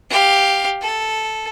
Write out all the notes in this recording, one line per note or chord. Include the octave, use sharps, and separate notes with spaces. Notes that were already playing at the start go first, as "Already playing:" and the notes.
G4 F5
A4